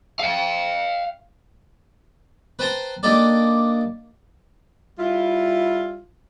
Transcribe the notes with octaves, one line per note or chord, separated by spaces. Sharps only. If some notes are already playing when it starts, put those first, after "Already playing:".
F5 G5
B4 C5 G5 A5 A#5 C6
A#3 D4 D#4 G4 A4 D5
G3 E4 F4